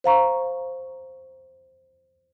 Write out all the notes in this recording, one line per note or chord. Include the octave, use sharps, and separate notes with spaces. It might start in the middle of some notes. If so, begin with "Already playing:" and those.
C5 F5 A#5 C#6